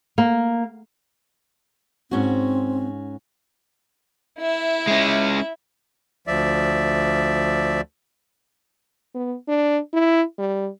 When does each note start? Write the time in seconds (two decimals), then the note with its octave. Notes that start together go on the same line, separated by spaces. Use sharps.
0.18 A#3
2.11 G#2 C4 C#4 F#4
4.38 E4 E5
4.87 G#3 C#4
6.27 D2 F3 D5 E5
9.15 B3
9.48 D4
9.93 E4
10.38 G3